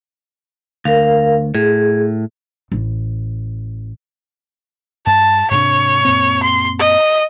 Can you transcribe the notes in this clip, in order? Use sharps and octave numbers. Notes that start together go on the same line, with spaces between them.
D2 A#4 F5
A2 G#4
A1
G2 A5
G#2 C3 D4 C#5
F#2 A#2 C4
C6
D#5